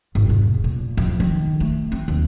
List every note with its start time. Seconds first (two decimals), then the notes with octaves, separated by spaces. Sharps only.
0.15 G#1
0.29 E1
0.64 A#2
0.97 F2
1.20 D#3
1.60 A3
1.92 C4
2.08 D#2